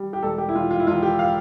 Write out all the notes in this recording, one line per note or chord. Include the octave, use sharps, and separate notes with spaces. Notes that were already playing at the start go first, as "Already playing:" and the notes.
Already playing: G3
G4
E1 A4
G4
E4
E1 F4
F4
E4
E1 F4
G4
F5